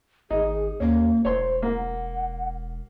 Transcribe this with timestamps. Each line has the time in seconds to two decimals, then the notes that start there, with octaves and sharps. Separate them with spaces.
0.30 G#1 D#4 G#4
0.80 D#2 A#3 C#4
1.25 E1 C5 C#5 C6
1.62 A#3 F#5